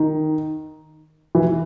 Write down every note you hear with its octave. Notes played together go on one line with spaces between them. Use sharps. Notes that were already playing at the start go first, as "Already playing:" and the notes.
Already playing: D#3
E3